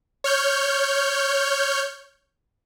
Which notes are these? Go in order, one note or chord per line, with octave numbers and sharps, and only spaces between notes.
C#5 F6 G6